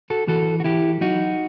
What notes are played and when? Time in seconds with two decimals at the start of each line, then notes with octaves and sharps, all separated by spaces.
0.10 F#4 A4
0.28 E3 F#4 A4
0.60 F#4
0.64 E3 E4 G4
1.01 F#3 D#4 F#4